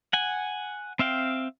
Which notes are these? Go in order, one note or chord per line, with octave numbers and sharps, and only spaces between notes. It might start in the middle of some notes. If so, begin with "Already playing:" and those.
F#5 G#5
C4 E5 F5 G5